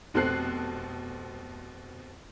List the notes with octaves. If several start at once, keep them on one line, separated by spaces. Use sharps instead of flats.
F1 B2 C4 A4 F#6 C7